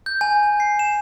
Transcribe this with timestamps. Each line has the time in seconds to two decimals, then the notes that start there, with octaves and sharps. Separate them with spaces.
0.06 G6
0.21 G#5
0.60 C7
0.79 E7